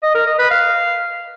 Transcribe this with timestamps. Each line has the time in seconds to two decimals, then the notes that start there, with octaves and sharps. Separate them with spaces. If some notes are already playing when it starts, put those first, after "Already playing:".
0.03 D#5
0.15 A#4
0.27 D#5
0.39 B4
0.51 F5